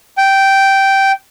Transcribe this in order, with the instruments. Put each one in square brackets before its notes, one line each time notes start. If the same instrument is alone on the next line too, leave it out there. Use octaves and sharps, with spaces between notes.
[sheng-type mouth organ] G5